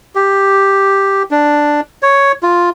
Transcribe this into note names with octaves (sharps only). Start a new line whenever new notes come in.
G4
D4
C#5
F4